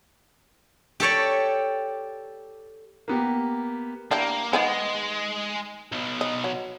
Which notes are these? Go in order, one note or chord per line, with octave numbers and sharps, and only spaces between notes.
G4 A4 C#5 D5
A#3 B3 G4
A#3 D4 E4 G4
D#3 G#3 B3 G#4
B1 B2
D#5
F#3